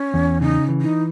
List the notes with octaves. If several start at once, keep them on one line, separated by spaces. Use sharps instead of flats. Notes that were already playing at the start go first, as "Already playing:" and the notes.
Already playing: C#4
E2
C#3 D#4
E3
D#4